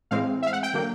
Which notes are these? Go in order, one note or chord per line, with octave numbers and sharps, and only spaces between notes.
A2 E3 G#3 C4 F5
E5
F5
F#5
G5
D3 F#3 A#3